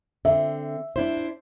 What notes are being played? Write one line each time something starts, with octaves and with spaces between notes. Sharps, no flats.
D3 C4 E5
D4 E4 C5